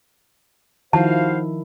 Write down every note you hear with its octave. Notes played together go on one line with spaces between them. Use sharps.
D#3 F3 E4 F#4 C5 F5 A5